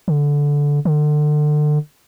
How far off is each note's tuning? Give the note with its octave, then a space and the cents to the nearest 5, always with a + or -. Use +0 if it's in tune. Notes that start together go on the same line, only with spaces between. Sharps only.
D3 -15
D3 +30